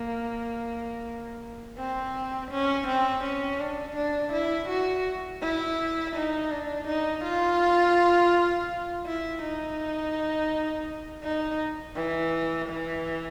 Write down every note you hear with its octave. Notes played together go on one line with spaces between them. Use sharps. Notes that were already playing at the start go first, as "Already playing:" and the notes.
Already playing: A#3
C4
C#4
C4
C#4
D4
D4
E4
F#4
E4
D#4
D4
D#4
F4
E4
D#4
D#4
E3
E3